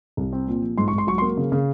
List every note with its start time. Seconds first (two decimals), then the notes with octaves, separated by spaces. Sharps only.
0.17 C2
0.33 C4
0.48 A#2
0.62 F3
0.78 G#2 C6
0.88 C#6
0.93 G#2
0.98 C6
1.07 F#3 C#6
1.18 C6
1.22 A#3
1.37 C#3
1.52 C#3